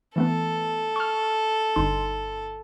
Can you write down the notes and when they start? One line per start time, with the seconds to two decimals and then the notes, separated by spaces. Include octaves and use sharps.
0.16 E3 A3 B3 A4
0.96 C#6 F6
1.76 G1 D#4 C6